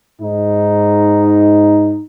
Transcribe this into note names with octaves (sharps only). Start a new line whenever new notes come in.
G#2 D#4